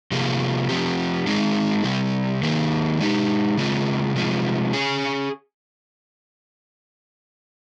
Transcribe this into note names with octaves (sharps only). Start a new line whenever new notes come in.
C3 F3 A#3 F4 G#4
F3 C4 G4
G#3 C4 D#4 G#4
C3 G3 C4
D#3 A#3 D#4 G#4
G#3 D#4 G4
C#3 G#3 C4 F4 G#4
C3 F3 G#3
C#4 G#4